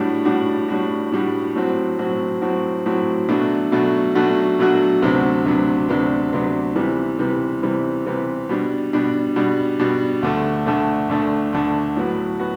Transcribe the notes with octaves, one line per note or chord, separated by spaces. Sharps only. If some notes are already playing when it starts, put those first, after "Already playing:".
Already playing: A2 G3 D4 F#4
A2 G3 D4 F#4
A2 G3 D4 F#4
A2 G3 D4 F#4
A2 F#3 C4 F#4
A2 F#3 C4 F#4
A2 F#3 C4 F#4
A2 F#3 C4 F#4
B2 F#3 A3 D4 F#4
B2 F#3 A3 D4 F#4
B2 F#3 A3 D4 F#4
B2 F#3 A3 D4 F#4
D2 C3 F#3 B3 D4
D2 C3 F#3 B3 D4
D2 C3 F#3 B3 D4
D2 C3 F#3 B3 D4
C3 E3 G3 B3
C3 E3 G3 B3
C3 E3 G3 B3
C3 E3 G3 B3
B2 G3 D4
B2 G3 D4
B2 G3 D4
B2 G3 D4
D2 D3 A3
D2 D3 A3
D2 D3 A3
D2 D3 A3
A2 F#3 B3 F#4
B3 F#4